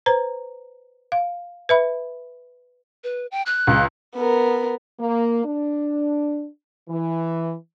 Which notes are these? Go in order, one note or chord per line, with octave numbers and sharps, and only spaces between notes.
B4 C5 A#5
F5
B4 E5 B5
B4
G5
F#6
C#2
B3 A#4
A#3
D4
E3